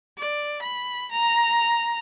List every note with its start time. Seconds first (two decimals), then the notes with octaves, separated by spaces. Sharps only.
0.18 D5
0.62 B5
1.12 A#5